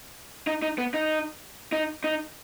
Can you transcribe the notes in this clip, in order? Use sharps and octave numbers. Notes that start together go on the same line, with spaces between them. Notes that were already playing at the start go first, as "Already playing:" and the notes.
D#4
D#4
B3
D#4
D#4
D#4